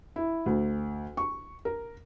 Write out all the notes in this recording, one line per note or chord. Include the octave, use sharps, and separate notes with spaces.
E4
D2
C#6
A#4